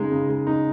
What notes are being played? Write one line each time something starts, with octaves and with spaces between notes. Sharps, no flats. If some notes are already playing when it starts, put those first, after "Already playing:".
Already playing: C#3 G#3 D#4
C#3
G#3
D#4